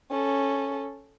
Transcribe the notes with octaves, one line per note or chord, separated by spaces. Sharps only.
C#4 A4